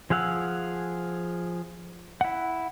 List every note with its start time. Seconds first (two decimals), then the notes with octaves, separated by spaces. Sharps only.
0.10 F3 G#4 F5 F#5 E6
2.21 E4 F#5